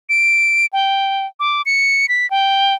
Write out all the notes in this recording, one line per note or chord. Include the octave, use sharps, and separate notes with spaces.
D7
G5
D6
C#7
B6
G5